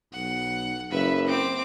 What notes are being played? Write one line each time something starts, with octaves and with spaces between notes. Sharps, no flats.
B1 F#5
F#1 B4 E5
C4 D6